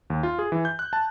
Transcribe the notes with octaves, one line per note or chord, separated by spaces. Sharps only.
D#2
F4
G#4
E3
G6
F#6
A5